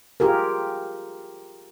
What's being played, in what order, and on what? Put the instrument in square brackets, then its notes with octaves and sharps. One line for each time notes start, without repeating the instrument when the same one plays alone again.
[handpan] F4 G4 G#4 A#4